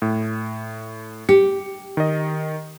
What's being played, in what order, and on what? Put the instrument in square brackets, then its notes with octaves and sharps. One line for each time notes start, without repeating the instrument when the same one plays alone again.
[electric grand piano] A2
[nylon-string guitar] G4 [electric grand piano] C#7
[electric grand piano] D#3 D#5